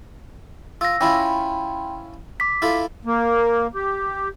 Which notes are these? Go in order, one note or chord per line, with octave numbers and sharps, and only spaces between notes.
F4 E6 A#6
C#4 E4 F4 G5 B5 C6
D6 B6
E4 F4 A4
A#3
G4